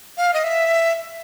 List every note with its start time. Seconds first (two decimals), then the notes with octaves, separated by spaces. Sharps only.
0.17 F5
0.34 D#5
0.44 E5